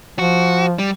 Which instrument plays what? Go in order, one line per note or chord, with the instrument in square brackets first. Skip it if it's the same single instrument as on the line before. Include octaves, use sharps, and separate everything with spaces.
[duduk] F3 [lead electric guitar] F#4
[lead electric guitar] G3